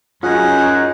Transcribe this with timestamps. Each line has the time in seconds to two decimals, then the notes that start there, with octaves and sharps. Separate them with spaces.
0.23 F#2 C#4 D#4 F4 G#4 F#5